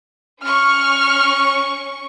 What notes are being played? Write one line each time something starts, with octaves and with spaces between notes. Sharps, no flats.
C#4 C#6 F6